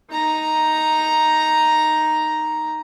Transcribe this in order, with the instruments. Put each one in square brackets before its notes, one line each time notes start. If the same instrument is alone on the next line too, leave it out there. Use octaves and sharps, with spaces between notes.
[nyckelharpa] D#4 A#5